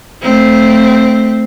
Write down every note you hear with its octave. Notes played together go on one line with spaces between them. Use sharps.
A3 C4